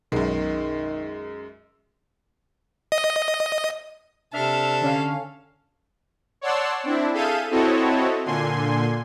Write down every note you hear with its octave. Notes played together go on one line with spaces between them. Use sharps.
B1 F#2 D#3 G#3
D#5
C3 D4 A4 E5 F6
D3 C#4 F5
C#5 D5 F#5 A5 C6 E6
C4 D4 E4
G#4 A4 E5 F5 G6 D#7
C4 E4 F#4 A4 C#5 D#5
A#2 D3 G#5 C6